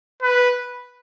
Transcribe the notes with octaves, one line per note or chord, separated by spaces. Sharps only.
B4